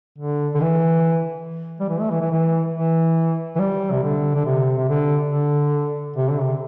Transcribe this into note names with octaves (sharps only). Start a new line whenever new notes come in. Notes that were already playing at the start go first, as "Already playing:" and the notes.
D3
D3
E3
G3
E3
A3
E3
E3
E3
E3
E3
G3
C3
D3
D3
C3
C3
D3
D3
C3
D3
C3